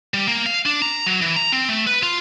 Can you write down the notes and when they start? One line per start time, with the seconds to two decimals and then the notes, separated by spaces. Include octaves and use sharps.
0.14 G3
0.27 A#3
0.46 F5
0.66 D4
0.82 A#5
1.06 F#3
1.22 E3
1.36 A#5
1.52 C4
1.69 A3
1.87 B4
2.03 F4